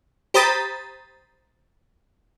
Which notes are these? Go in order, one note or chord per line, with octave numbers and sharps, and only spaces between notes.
G4 C5 A#5 B5 D#6 A6